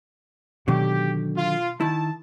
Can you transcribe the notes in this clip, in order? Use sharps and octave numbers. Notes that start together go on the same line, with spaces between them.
B2 D3 D#3 F#3 G4
F4
D#3 E4 A5